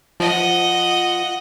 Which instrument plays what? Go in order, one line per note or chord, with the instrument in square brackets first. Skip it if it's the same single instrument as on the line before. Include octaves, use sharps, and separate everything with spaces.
[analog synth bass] F3 [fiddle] D#5 F#5